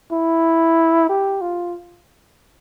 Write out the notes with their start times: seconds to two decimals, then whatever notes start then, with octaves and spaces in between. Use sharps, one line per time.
0.12 E4
1.09 G4
1.41 F4